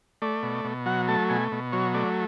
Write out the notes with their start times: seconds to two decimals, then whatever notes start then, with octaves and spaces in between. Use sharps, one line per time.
0.22 A3 D5
0.43 B2
0.65 B2
0.86 F#3 F#5
1.08 A3 A5
1.29 B2 G#5
1.52 B2
1.72 F#3 C#5
1.94 A3 D5